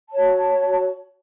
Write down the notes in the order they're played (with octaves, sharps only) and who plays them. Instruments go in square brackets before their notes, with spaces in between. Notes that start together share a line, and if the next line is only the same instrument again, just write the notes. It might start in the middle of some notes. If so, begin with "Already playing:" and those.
[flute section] F#4 C#5 A5